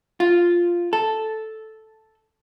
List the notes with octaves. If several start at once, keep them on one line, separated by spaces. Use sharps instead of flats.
F4
A4